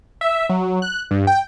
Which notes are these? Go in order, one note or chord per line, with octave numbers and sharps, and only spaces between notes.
E5
F#3
F#6
G2
G5